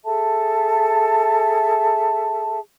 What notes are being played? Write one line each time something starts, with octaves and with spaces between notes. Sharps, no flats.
G#4 A4 E5 A5